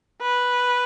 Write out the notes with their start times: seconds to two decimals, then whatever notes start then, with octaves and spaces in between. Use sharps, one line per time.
0.22 B4